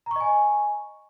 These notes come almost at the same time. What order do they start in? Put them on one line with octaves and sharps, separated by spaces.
A#5 C#6 D#5 G#5